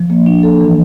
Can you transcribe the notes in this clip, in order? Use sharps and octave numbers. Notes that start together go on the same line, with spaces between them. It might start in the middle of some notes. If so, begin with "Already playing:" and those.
Already playing: F3
A#3
D4
A4
E3